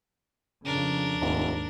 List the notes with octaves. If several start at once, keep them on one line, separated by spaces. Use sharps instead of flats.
F2 C#3 D4 A#4
F1 D#2 G#2